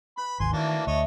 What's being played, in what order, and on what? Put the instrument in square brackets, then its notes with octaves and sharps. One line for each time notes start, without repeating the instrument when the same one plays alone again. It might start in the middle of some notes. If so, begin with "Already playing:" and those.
[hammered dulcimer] B4 [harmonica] B5
[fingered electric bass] G#1 D#2 [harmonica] G#5 C6
[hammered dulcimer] A2 F#4 C#6 [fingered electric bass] D#3 [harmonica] E3 A#3 D4
[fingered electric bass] D2 [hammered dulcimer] E3 [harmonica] D4 C#5 D#5